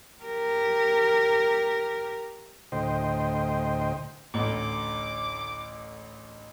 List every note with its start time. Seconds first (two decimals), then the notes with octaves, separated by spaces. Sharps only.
0.23 G4 A#4
2.72 D2 A2 C5 D#5 G5
4.34 A1 D2 D6